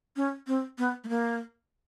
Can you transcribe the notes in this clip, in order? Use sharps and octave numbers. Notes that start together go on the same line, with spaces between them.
C#4
C4
B3
A3
A#3